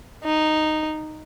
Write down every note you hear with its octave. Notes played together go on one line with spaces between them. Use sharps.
D#4